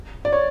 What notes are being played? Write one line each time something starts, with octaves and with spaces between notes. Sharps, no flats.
D5
C#5